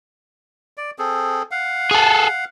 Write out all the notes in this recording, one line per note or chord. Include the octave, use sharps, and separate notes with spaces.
D5
C4 G#4 A4
F5 F#5
G#4 A4